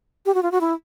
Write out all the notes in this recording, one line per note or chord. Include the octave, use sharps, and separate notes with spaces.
G4
F#4
F4
F#4
E4